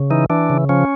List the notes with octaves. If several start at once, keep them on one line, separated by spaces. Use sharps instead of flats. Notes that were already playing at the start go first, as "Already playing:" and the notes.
Already playing: C#3
E3 D#4
E3 D4
C#3
F3 C#4